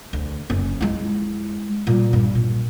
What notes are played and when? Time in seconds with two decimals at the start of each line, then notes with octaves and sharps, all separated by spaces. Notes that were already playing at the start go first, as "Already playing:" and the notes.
0.13 D2
0.50 F#1 C#4
0.81 G#3 E4
1.87 A#2 G3
2.13 G2
2.35 A#2